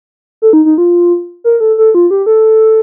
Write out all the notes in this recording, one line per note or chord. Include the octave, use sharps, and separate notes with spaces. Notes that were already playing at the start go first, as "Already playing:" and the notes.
A4
D#4
D#4
F4
A#4
A4
A4
F4
G4
A4